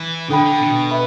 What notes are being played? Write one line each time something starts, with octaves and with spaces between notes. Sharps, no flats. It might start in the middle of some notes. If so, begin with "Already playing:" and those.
Already playing: E3
D3 D4 A4 G5 B5
D3
B2
B4 E5 B5